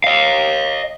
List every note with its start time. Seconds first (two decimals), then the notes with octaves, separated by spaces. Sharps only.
0.04 D#5 F5